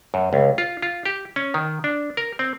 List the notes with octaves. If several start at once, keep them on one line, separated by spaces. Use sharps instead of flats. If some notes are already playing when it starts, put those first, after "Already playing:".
F#2
C#2
F4
F4
G4
C#4
D#3
D4
A#4
C4